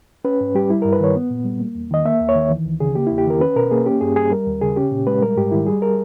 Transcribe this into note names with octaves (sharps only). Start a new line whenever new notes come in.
C#4 B4
G#2
G3 G4
G3 E4
G2 A#4
B4
D#3 C#5
B3
A#2
G3
A#3
E2
D#3 D#5
A#3 E5
D#2
C#5
D#3
E3
C#2
C#3 G#4
A#3 G4
E2 E4
G4
D#3 A#4
C#4 B4
B2 A#4
A#3 G#4
C#4 G4
G2 G#4
G3 G#4
G3 A#4
D#2
C#3 G#4
C#4 G4
A#2
G#3 B4
G3 A#4
G#2 G4
D#3 E4
G3 G#4
A#4